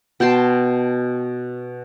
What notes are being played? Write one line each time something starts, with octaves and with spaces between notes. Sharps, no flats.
B2 G5 A5 C6